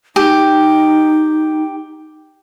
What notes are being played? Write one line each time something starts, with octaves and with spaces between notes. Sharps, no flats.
D#4 G4